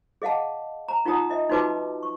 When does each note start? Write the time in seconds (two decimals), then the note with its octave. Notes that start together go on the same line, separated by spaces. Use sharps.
0.22 G#4 D#5 F5 F#5 A5
0.88 A#5
1.05 D#4 F4 F#5 G5 A#5 D#6
1.30 F4 D#5 E5
1.49 D#4 F4 F#4 B4 A5 D6
2.03 C#6